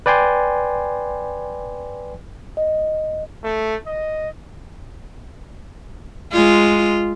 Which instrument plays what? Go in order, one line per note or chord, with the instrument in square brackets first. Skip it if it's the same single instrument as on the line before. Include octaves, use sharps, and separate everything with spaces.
[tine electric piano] B4 D5 G5 G#5 C6
[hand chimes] D#5
[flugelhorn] A3
D#5
[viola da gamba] G#3 F4